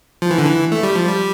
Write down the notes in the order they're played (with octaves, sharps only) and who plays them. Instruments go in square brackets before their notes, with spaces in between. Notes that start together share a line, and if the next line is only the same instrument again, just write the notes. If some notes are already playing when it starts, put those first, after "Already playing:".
[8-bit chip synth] F3
E3
D3
E3
A3
G3
F3
G3